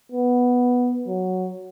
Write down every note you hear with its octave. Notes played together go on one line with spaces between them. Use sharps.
B3
F#3